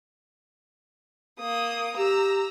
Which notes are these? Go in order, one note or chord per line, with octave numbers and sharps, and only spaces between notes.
A#3 D#6
G4 A#5 E6